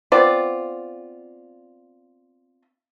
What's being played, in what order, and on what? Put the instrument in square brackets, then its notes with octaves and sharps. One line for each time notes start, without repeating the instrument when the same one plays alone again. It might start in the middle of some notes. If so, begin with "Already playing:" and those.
[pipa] B3 C4 F4 D5